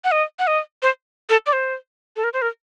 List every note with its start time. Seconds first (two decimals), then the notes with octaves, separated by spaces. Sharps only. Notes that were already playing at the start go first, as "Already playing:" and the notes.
0.04 F#5
0.12 D#5
0.39 F#5
0.47 D#5
0.82 C5
1.30 A4
1.46 D5
1.53 C5
2.16 A4
2.24 A#4
2.33 C5
2.42 A#4